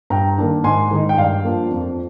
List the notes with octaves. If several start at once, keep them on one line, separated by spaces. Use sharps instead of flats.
G2 G5 A#5
D#3 A#3 D4
G#2 G#5 C6
D#3 G#3 D#4
G5
G2 D5 F5
F3 A#3 D4 F4
F2